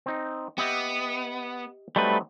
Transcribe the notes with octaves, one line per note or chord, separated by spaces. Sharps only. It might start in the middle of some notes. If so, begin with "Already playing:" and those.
C4 D#4
B3 G4 D#5 E5
F#3 G3 A3 C4 D#4 B4